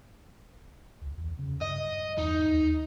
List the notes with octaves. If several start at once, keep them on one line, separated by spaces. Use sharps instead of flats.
C#2
E2
C#3
G2 D#5
E2 D#4
D#2